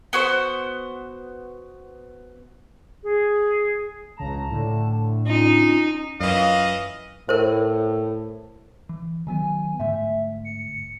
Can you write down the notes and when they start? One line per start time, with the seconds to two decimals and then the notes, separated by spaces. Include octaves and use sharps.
0.13 B3 F#4 C5
3.03 G#4
4.18 C#2 C#3 A5 A#5
4.50 A2 D3
5.27 C#4 D#4 F4
6.20 F#2 E3 F4 D#5 F5
7.29 A2 A#4 C5
8.89 E3
9.27 D#3 F#3 B3 G#5
9.80 G#2 D3 A3 E5
10.44 C#7